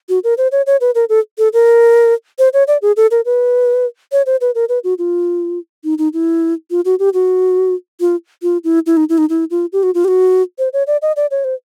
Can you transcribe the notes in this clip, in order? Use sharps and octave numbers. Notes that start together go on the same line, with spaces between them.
F#4
A#4
C5
C#5
C#5
B4
A#4
A4
A4
A#4
C5
C#5
D5
G#4
A4
A#4
B4
C#5
C5
B4
A#4
B4
F#4
F4
D#4
D#4
E4
F4
F#4
G4
F#4
F4
F4
E4
E4
D#4
E4
D#4
E4
F4
G4
F#4
F4
G4
F#4
C5
C#5
D5
D#5
D5
C#5
C5